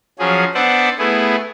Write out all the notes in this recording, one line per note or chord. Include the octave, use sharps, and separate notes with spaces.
F3 F#3 C#4 G#4
B3 D4 C5 D5 E5 F#5
A3 B3 E4 G#4